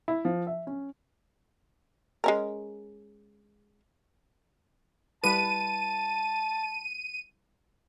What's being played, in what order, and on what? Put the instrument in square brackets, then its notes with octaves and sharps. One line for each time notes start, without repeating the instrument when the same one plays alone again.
[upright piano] E4
F3
E5
C#4
[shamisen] G#3 C#4 A#4
[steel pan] G3 E4 B4 [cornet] A5 [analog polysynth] D#7